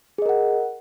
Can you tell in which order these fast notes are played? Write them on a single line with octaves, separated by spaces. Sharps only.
G#4 D#5 A#4 F#5